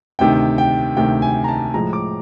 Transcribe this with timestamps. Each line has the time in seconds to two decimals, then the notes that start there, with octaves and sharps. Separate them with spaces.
0.19 D2 C3 D#3 G5
0.58 G5
0.96 D2 C3 D#3 G5
1.22 G#5
1.44 A#5
1.48 A5
1.74 A2 F3 G#3 A#5
1.93 D6